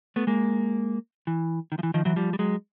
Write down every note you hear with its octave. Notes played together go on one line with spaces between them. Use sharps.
A3 B3
G#3 A#3
E3
D#3
F3
E3
D#3 F3
E3 F#3
F3 G3
G3
F#3 G#3